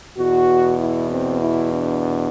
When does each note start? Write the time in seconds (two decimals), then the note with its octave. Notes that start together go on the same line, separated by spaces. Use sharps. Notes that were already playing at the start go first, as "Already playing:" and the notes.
0.17 E2 B2 F#4
0.80 E4
1.10 C4
1.41 E4
1.72 D4